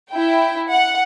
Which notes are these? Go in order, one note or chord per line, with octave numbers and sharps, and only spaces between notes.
E4 G5
F#5